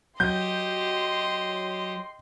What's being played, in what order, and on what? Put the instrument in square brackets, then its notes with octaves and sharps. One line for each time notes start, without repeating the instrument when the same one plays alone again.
[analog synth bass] F#3 [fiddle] G4 D#5 [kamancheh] C6 [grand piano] G6